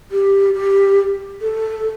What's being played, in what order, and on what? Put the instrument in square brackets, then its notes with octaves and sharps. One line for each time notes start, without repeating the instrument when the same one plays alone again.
[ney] G4
G4
A4